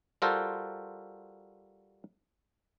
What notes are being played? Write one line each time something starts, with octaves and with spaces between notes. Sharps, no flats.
G3 F4 F#4 A4 A#4 C5